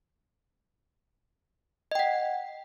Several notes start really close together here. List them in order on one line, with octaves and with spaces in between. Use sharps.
D#5 G5 F#5